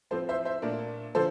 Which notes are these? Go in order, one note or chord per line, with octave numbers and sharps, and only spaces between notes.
A2 F3 C4 A4 C5
C5 E5
C5 E5
A#2 A3 D4 A#4 D5
D3 F3 A4 C5